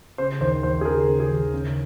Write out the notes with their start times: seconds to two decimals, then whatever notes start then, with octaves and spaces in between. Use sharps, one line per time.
0.18 C#3 C5
0.41 D#2 C5
0.63 D#2 C5
0.81 G#4
0.85 C#3 A#4
1.08 C#3
1.20 G#4
1.31 D#2
1.54 C#3